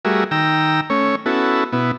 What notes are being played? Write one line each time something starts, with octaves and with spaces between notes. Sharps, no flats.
G3 A3 F#4 G#4 A#4 E5
D#3 G5 A#5 E6
A3 C#4 C#5
B3 C#4 E4 F#4 A4
B2 B3 E4